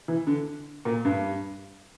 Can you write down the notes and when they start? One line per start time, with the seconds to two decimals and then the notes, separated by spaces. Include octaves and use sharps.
0.08 E3
0.27 D3
0.85 A#2
1.05 G2